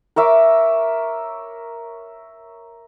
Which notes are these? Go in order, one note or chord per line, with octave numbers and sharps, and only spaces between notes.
A#4 C#5 E5 D6